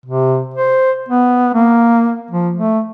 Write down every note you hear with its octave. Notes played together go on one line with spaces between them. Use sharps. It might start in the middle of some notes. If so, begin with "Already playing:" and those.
C3
C5
B3
A#3
F3
A3